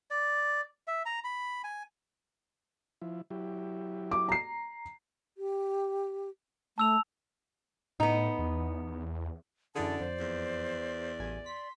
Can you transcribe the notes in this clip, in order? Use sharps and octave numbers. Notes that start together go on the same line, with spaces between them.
D5
E5
A#5
B5
G#5
F3 E4
F#3 E4 G4
D6
A#5 C7
G4
A3 A5 E6 F7
A2 B3 D#4
E2
F#2 D3 E3 G#4 D5 A5
F2 C5
E2
A1 G#5
C6 B6